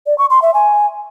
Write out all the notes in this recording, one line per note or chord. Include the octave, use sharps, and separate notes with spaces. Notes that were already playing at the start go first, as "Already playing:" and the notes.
D5
C#6
C6
E5
G#5